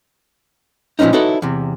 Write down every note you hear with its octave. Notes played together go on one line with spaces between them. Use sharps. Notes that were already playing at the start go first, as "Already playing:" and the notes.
A#2 F3 G3 B3 C#4 D#4
D#4 E4 F#4 A4 B4 C#5
E2 C3